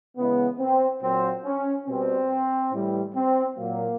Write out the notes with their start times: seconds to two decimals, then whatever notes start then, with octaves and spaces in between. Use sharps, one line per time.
0.17 C#3 E3 G#3 B3
0.59 C4
1.02 A#2 F#3 C4
1.44 C#4
1.87 B2 G3 C4
2.72 A2 E3 G3
3.15 C4
3.57 A#2 F#3 A#3